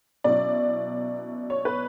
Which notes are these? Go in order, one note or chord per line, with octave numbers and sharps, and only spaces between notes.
B2 F#3 C#4 E4 D5
C#5
B4